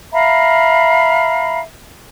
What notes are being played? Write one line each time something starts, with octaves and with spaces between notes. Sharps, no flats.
E5 F5 A#5 B5